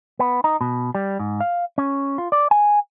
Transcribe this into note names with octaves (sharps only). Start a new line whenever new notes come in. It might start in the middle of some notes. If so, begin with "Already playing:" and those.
B3
D#4
B2
G3
G#2
F5
C#4
F4
D5
G#5